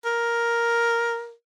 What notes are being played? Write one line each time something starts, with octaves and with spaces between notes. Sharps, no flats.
A#4